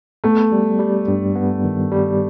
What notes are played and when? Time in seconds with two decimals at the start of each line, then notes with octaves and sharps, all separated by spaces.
0.24 A3 B3
0.52 G3
0.79 G3
1.08 G2
1.35 B3
1.64 D#3
1.91 G3